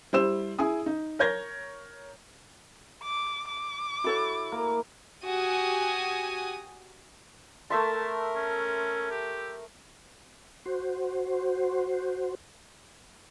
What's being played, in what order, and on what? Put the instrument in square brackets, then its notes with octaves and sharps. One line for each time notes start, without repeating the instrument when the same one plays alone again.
[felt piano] G3 E4 C5 E6 E7
E4 G#4 G#5 D#6
D#4
A#4 C#5 G6 G#6 A#6
[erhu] D6
D6
[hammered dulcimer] E4 [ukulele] F#4 A4 C#5
[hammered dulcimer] A#3
[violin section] F#4 G4 G#5 D#6
[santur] A3 E5 C6 [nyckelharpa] A#4 [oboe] A5
[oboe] C#4
G4
[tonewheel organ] F#4 C5